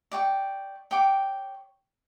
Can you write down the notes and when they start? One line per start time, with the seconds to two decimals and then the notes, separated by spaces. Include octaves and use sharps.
0.12 D5 G5 C#6
0.91 C#5 G5 D6